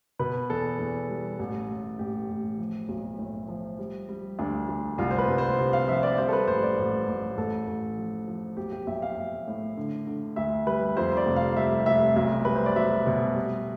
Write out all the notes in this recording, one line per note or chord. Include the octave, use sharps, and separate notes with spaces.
B2 B4
E2 A4
E2
G3
A1
A2
A1 G4
A1
F3
B1
A2
F3
G3
G3
D2 D4
D2
C2 F4
C5
B4
C2
C5
C3
F5
F3 E5
D5
G3 C5
A4
B4
A1 C5
D5
A1
A1
A1 A4
A1
F3
F3
B1 G4
G4
B1 E5
F5
B1
A2
D3
D3
D2 E5
G3 B4
F2 C5
D5
F1
F5
G3 E5
F1 E5
B1 E5
G3 B4
C5
D5
B1 E5
B2
G3